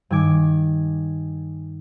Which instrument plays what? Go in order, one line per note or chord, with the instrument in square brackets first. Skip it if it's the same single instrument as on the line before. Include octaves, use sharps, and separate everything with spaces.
[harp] G2 D#3 G#5 D6